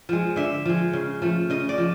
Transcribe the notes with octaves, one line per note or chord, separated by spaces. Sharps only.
F3 G#3
D3 E5
F3 G#3
C#3
F3 A3
C#3 D#5
D5
F3